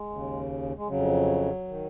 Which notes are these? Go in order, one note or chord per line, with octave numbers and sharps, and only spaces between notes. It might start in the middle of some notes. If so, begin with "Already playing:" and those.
Already playing: G#3
D#2 C#3
G#3
F2 C#3 F#3
D#3